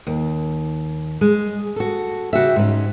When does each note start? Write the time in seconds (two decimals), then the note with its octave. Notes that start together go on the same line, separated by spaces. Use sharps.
0.07 D#2
1.21 G#3
1.76 F#4 A4
2.33 C#3 F#4 G4 E5
2.56 G#2 C#4